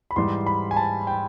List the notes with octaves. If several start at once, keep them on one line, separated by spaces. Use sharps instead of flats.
B5
G#2 E3 G3 C6
B5
G#5
A5
G5